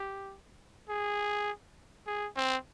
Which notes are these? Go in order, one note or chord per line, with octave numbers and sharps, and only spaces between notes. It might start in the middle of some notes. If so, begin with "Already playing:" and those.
Already playing: G4
G#4
G#4
C4